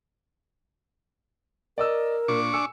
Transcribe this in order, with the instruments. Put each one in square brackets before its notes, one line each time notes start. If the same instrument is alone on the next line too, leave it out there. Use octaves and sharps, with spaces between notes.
[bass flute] A#4 [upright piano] D5 D#5 E6
[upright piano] A#2 [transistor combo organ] D4 C#6 D6
[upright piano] G#5 E6 C#7